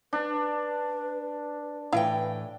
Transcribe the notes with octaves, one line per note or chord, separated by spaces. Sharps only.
D4 B4
A2 E3 E4 B4 F5 G5